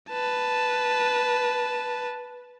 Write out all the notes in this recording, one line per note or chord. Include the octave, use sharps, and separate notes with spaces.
B4 A5